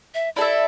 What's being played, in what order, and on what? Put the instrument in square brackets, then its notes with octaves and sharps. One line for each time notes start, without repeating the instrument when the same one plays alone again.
[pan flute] E5
[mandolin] E4 A4 E5 [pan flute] D5